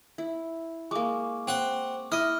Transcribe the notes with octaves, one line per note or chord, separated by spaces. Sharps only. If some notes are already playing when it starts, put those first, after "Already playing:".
E4
G#3 A#3 C#6 D6
C4 F#5
E4 D#5 F6